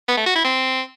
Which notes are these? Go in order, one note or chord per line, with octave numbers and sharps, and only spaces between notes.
B3
A3
F#4
E4
C4